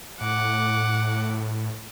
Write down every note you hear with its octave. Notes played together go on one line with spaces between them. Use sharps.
A2 F#5 D6